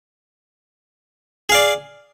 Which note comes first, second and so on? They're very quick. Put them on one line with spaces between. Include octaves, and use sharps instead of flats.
G#4 F5 D5